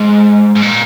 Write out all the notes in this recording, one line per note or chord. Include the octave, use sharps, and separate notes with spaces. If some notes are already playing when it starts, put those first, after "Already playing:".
Already playing: G#2
G#2
A#2